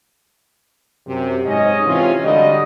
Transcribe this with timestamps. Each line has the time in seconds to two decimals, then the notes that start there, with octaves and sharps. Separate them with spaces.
1.07 F#2 C3
1.45 G#2 C#4 D#5
1.86 C3 E3 C#4 F4
2.23 G#2 D3 G3 F#4 G4 D#5